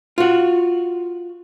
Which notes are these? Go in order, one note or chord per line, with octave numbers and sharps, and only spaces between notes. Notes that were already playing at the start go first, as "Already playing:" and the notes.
F4 F#4